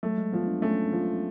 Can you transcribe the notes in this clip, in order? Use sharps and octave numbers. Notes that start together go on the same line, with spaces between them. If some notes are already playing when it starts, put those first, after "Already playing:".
F#3 A3
G#3
F3 B3
D4
A3 C#4
F3